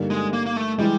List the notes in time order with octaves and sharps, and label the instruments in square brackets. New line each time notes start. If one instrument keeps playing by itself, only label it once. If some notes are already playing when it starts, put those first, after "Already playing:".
Already playing: [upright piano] G2 D3 G3 A#3 D#4
[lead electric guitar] G#3
A#3
A#3
A3
[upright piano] E3 G#3 [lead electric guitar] G3